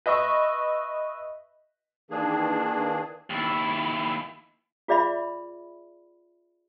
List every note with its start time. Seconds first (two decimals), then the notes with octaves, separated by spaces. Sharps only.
0.06 B4 D#5 E5 C#6
2.11 D#3 E3 A#3 D4 G#4
3.30 D#2 E4
4.88 F4 G#4 D5 E5 B5